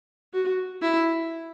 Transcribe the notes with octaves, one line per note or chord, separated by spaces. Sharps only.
F#4
E4